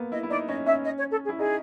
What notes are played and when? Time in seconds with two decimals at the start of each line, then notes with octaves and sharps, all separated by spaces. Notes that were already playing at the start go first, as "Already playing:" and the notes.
Already playing: A#3 B3
0.12 E4 D#5
0.23 E4
0.30 D#4 D5
0.48 C#4 D#5
0.66 C#4 E5
0.84 D#5
0.98 C#5
1.11 A4
1.25 G#4
1.29 E4
1.38 D#4 G#4